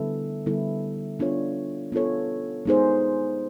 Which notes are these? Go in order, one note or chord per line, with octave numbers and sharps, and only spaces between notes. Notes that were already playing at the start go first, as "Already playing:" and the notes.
Already playing: D3 G3 B3 E4 A4
D3 G3 B3 E4 A4
B3 D4 F4 A4 C#5
B3 D4 F4 A4 C#5
G#3 B3 D#4 G#4 C5